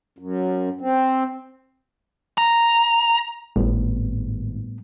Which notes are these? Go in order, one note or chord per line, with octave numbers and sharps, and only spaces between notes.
F#2
C4
A#5
G#1 A2 G3 B3